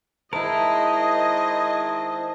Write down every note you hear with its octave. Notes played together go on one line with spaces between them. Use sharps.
D#3 G#3 E4 A#4 C5 D#5 A5